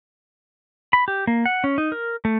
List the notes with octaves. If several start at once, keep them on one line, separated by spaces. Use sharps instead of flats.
B5
G4
A#3
F#5
C#4
D#4
A#4
A3